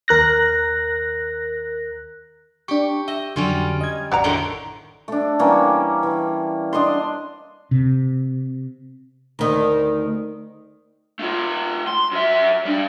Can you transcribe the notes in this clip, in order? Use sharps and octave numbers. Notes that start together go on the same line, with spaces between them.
D#2 A#4 F#6 A#6
D4 G4 C#6
D#5 E5
F2 D3 F#3 G3 C#4 F4
D#5 G#6
A1 F2 F#4 D5 A#5
A2 D3 D#3
A3 D4
E3 G3 A#3 C#4
E3
D4 D#5 F5 C6
C3
D2 D#3
A3 F4
C6
F#2 E5
G3 D4